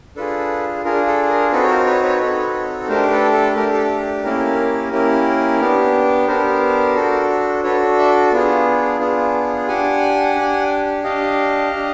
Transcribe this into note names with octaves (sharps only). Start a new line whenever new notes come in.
D4 F4 G#4 A4 B4
D4 F4 G#4 A#4
A4
A#4
C4 D#4 F#4 A4 B4
C#5
A#4 C5
B4 C#5
B4 C#5
C4 D#4 F#4 A4
A3 D4 G4 A#4 C5
A4 B4
A4
A3 D4 G4 A#4
A4
A#3 C#4 E4 G4 A#4
A#3 C#4 E4 G4
B3 D4 G4
B3 D4 G4 A#4 C5
D4 F#4 A4
D4 F#4 A4 B4 C#5
D5 E5
B3 D4 F4 G#4
B3 D4 F4 G#4
D4 G4 F#5 G#5
D4
G4
D4 G4 D#5 F5
D4 G4